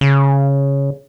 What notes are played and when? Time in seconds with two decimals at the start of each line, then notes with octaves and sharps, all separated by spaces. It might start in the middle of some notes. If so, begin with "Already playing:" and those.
0.01 C#3